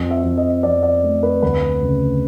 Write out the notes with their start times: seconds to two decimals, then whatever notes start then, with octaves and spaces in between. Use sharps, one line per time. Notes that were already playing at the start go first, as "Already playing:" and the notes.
Already playing: F2
0.11 E5
0.24 F2
0.38 D#5
0.63 F2 D5
0.83 D5
1.03 A3
1.23 B4
1.42 D2 B4
1.82 C#3